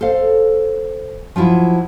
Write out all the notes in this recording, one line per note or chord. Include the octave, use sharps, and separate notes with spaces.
A4 C5 F5
F3 F#3 E4 F4